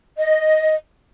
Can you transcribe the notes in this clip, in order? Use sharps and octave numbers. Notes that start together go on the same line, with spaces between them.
D#5